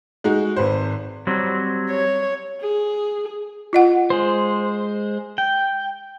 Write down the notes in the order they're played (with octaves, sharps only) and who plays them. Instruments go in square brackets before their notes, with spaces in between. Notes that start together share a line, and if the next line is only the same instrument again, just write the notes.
[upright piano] G#3 D#4 F#4
G#1 B4 C5
[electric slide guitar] F#3 G3 C4
[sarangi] C#5
[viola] G#4
[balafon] F4 D#5 F#5
[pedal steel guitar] G#3 C5
G5